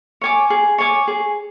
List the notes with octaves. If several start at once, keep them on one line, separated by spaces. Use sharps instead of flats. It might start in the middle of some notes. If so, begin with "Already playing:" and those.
C#5 G#5 D6
G#4
C#5 G#5 D6
G#4